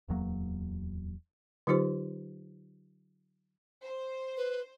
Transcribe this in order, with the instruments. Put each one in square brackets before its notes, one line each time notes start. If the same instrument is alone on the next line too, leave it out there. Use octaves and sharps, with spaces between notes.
[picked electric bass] D1 E2 F#3 A#3
[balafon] D3 F#3 D#4 F4 G4 C5
[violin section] C5
[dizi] B4